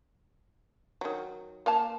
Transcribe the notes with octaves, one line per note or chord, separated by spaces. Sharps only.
D#3 F#3
A#3 F5 A5